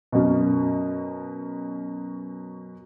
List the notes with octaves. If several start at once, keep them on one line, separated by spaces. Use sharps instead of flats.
F#2 B2